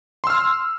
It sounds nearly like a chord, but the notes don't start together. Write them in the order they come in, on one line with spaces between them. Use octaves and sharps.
C6 E6 F6